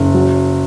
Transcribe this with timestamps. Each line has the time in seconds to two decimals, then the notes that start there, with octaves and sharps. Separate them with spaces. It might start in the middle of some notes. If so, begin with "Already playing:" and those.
Already playing: F#1
0.14 F#3